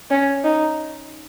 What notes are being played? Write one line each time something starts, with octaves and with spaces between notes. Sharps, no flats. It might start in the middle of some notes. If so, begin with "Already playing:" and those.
C#4
D#4